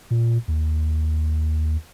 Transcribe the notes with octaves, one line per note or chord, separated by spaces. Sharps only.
A#2
D#2